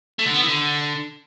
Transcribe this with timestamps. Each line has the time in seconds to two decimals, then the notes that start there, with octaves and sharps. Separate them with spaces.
0.19 A3
0.26 D3
0.33 B3
0.41 E3
0.48 D3